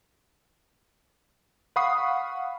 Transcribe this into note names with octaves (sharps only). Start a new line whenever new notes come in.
F5 F#5 B5 C#6 D#6 C7